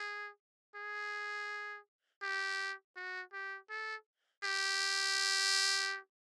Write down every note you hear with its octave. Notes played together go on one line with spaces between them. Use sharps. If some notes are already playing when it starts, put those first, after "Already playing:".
Already playing: G#4
G#4
G4
F#4
G4
A4
G4